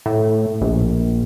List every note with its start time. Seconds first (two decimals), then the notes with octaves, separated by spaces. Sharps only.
0.06 A2
0.61 A#1